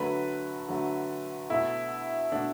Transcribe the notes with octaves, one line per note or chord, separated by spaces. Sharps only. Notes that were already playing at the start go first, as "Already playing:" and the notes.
Already playing: D3 F#3 A3 B4
D3 F#3 A3
B2 A3 E4
B2 A3 D4